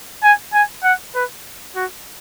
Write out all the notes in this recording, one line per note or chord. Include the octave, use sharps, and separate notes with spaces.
G#5
G#5
F#5
B4
F#4